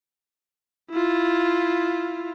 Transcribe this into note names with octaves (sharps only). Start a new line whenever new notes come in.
E4 F4